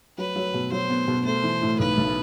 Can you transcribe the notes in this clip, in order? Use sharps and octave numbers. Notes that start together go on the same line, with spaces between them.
F#3 B4
F#3
B2
F#3 C5
B3
B2
A3 C5
E3
A2
B1 B4
B1